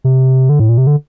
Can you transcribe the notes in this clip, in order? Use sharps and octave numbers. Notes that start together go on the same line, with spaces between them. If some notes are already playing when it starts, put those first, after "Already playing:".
C3
D3
A2
A#2
C3
D3